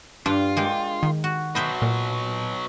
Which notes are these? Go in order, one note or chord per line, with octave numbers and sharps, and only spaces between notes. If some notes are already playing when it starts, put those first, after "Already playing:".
G2 D4 F4
G#3 A#3 G4
D#3
F#4
B2 F#3 B3 C5 E5
A#2